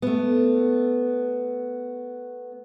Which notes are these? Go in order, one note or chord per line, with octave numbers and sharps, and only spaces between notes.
A3 B3